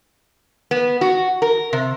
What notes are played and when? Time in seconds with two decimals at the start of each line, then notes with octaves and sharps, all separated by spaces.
0.71 B3
1.01 F#4
1.42 A#4
1.73 C3